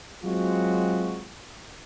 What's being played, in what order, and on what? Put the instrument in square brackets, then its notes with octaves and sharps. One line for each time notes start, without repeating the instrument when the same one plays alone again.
[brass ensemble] F#3 G#3 C4 F4 F#4